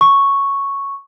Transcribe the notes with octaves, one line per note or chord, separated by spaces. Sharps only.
C#6